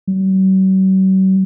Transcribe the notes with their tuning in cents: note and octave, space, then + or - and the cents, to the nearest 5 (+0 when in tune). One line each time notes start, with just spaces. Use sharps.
F#3 +45